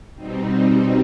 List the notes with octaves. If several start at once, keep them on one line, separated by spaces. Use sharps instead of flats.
B2 G3 C4 D#4